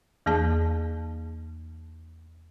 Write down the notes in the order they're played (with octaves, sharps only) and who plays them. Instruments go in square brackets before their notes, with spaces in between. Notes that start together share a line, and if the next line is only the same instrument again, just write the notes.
[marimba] E2 E3 A#3 G#4 A5